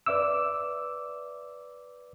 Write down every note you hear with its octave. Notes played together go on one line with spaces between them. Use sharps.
B4 D5 E5 D6 E6